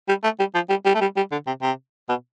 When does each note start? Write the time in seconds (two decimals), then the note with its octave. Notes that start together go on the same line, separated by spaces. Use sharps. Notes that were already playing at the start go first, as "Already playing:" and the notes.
0.08 G3
0.24 A3
0.39 G3
0.54 F3
0.69 G3
0.85 G3
0.95 A3
1.01 G3
1.16 G3
1.31 D3
1.47 C3
1.62 C3
2.09 B2